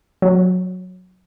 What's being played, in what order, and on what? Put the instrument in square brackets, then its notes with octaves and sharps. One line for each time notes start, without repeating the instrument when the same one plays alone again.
[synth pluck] F#3